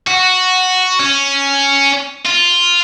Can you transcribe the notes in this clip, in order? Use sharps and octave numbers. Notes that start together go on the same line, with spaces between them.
F#4
C#4
F4